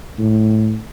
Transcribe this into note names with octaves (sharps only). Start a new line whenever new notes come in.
A2